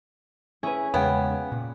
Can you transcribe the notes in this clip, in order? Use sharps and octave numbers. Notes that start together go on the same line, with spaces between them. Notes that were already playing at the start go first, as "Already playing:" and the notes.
C#4 E4 G#4 B4 G#5
E2 C#3 G#3 B3 C#5 F5 G5
A#2